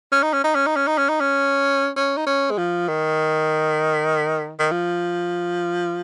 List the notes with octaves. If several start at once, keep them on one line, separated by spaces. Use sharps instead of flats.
C#4
D#4
C#4
D#4
C#4
D#4
C#4
D#4
C#4
D#4
C#4
C#4
D#4
C#4
G#3
F3
D#3
D#3
F3